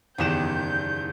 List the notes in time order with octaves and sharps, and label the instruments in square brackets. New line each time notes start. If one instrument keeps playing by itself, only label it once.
[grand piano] F#1 E2 E7 [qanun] D#3 G4 F#5 [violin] G6